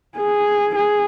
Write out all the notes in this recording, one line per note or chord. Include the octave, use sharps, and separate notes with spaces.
G#4
G#4